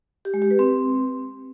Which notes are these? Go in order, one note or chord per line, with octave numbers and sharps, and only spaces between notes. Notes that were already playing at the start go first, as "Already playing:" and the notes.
G4
G#3
G4
B4
C4